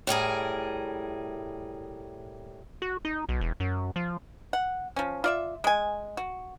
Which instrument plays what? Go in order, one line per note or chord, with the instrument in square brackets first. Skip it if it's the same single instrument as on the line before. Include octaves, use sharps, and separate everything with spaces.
[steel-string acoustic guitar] A2 G3 G#4 A#4
[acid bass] F#4
D#4
B1
E1
F#2
F3
[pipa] F#5
F3 C#4
F4 D5 E5
G#3 G#5
F#4